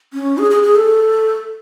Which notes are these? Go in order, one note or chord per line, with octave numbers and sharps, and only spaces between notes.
C#4
G#4
G#4
G#4
A4